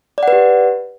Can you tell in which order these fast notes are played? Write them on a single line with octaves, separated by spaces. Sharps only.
D5 F#5 B4 G4